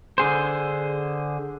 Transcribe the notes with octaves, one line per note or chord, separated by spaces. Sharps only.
D3 G#4 C5